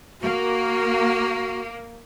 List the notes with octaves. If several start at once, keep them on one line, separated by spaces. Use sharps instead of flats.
A#3 F#4